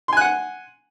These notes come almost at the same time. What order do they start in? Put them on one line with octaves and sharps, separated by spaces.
C6 G#5 F#6 F#5